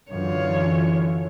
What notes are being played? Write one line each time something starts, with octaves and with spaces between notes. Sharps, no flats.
F#2 D3 E3 F4 C#5